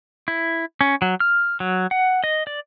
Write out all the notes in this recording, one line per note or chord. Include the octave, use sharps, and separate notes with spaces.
E4
C#4
F#3
F6
F#3
F#5
D#5
D5